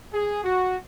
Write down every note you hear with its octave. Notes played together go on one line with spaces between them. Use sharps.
G#4
F#4